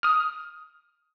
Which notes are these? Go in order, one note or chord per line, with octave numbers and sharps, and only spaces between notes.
D#6 F6